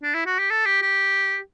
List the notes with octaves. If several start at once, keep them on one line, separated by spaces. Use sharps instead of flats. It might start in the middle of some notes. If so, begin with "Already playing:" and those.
D4
E4
F#4
G4
A4
G4
G4